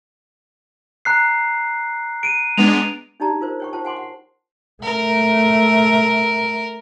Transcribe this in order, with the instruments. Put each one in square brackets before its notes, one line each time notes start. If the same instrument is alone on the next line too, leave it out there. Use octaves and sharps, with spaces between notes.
[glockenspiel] A#5 F#6 C7
D7 D#7
[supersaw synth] G#3 B3 D4 [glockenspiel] F7
[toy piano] D4 D#4 G4 D5 A5 A#5
F4 A#4 C5
C#5 G5 C#6
F4 C5 G5 A5
F#5 G#5 C6 D6
F#5
[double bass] A3 [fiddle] A#4